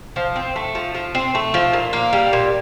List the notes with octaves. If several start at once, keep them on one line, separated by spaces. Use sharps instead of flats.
F3
C4
A3
F3
F3
C4
A3
F3
A#2
A#3
G3
A#2